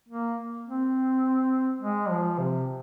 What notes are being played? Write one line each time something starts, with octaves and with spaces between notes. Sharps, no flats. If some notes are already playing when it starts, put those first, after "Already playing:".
A#3
C4
G#3
F3
C3